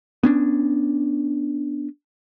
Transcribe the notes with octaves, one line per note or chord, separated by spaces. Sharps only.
B3 C#4 D4